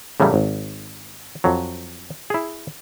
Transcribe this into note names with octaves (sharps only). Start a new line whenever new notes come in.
A2 C#3 E3 F#3 G3 A3
G#1
F2 F#3
E4 G#4